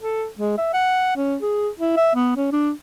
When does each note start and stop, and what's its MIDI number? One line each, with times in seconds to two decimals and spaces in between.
0.01 0.27 69
0.39 0.54 56
0.58 0.70 76
0.74 1.15 78
1.17 1.37 61
1.42 1.69 68
1.79 1.94 64
1.97 2.12 76
2.15 2.32 59
2.37 2.48 61
2.52 2.72 62